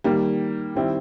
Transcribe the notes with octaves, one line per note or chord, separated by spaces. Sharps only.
D#3 G3 A#3
D#3 G3 C4 E4